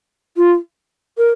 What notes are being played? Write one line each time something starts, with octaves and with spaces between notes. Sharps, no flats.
F4
A#4